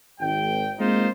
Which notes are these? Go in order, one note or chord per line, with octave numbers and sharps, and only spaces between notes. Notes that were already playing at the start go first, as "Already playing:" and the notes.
G#1 G5
G#3 A#3 C4 D#4 F4 C5